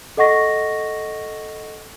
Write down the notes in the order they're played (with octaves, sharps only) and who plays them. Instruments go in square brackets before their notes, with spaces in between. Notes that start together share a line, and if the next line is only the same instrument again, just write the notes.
[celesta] A4 D#5 F#5 C#6 A#6